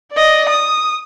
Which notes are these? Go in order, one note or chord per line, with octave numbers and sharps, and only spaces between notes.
D5 D#5
D#6